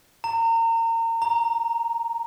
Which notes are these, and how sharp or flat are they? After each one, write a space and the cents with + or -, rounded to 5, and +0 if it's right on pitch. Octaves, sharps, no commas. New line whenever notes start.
A#5 -30
A#5 +5